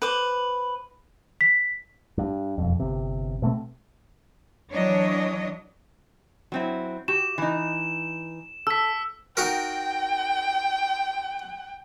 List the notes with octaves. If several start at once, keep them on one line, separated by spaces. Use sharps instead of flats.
B4 C5 D6
B6
G2
E1 F2
G1 C3
B2 A3 A#3 C4
E3 F#3 D4 C#5 D#5
F#3 C4 E4
F#4 G4 E7
E3 D#4
A4 E6 B6
D#4 F#4 A#4 G5